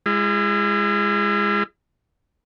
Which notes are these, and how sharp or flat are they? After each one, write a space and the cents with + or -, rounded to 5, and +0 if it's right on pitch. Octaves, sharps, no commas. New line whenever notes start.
G#3 -20 E4 +40